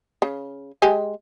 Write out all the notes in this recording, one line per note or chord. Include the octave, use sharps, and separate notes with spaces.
C#3
G#3 G4 G#5